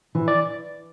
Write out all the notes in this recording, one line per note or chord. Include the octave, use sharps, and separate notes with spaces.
E3
D5